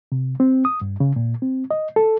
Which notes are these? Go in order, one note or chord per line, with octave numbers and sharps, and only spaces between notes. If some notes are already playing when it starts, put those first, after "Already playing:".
C3
C4
D#6
G2
C#3
A#2
C4
D#5
A4